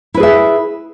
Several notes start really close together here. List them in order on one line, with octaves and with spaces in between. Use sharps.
E4 B4 G#4 E5